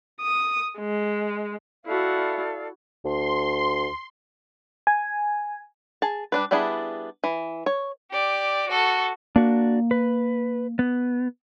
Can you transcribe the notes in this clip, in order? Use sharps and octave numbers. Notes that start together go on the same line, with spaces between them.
D#6
G#3
E4 F#4 A4 D5 F5
D2 C6
G#5
G#4 A5
G3 D4 B4
G3 B3 D4 E4 G#4
E3
C#5
G4 D5
F#4 A4
A#3 D4 F#4
B4
B3